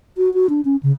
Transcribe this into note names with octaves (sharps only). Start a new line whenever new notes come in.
F#4
F#4
D4
C#4
C#3